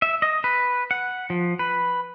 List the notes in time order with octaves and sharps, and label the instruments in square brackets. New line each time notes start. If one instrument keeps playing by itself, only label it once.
[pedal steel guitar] E5
D#5
B4
F#5
F3
B4